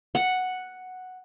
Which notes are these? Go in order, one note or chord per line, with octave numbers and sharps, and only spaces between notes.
F#5